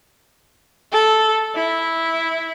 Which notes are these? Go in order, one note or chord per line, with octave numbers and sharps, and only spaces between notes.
A4
E4